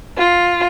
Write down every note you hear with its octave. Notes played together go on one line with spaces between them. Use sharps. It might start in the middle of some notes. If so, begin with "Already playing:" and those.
F4